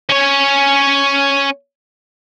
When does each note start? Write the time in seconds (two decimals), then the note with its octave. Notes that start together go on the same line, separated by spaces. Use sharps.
0.10 C#4 C#5